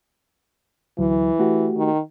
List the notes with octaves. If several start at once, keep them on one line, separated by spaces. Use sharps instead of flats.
D2 E3 F#3
A3 F#4 G4
D#3